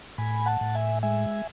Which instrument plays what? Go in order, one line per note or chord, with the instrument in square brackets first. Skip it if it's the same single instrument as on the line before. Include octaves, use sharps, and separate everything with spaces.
[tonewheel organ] A2 G#5 B5
F#5 A5
A2
E5 G#5
G#3 E5 G#5